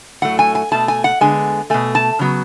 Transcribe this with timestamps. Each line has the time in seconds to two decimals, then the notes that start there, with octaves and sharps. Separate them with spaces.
0.22 A2 F#3 A3 F#5
0.39 G#5
0.55 G#5
0.71 B2 A3 A5
0.88 G#5
1.04 F#5
1.21 D3 G#3 B3 G#5
1.70 B2 A3 G#5
1.95 A5
2.19 C#3 F#3 B3